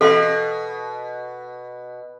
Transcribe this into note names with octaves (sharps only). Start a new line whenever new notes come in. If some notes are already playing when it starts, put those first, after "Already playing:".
B2 A4 F5 C6